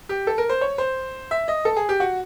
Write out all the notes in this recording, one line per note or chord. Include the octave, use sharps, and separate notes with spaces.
G4
A4
A#4
C5
C#5
C5
E5
D#5
A4
G#4
G4
F#4